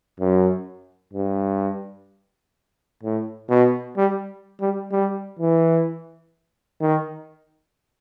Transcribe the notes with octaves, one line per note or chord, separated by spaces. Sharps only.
F#2
G2
A2
B2
G3
G3
G3
E3
D#3